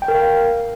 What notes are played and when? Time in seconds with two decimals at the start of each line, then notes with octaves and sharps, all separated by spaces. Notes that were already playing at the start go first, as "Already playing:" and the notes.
0.02 G5
0.08 A#4
0.15 F5